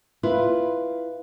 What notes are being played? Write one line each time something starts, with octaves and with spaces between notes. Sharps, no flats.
E4 F4 B4